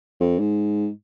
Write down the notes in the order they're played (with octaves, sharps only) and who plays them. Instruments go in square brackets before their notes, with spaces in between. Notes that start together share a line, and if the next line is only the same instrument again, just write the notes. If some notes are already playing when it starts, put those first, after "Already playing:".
[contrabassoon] F2
G#2